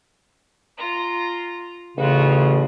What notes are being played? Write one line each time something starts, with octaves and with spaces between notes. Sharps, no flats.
F4 A#5
A1 C#3 F4 F#4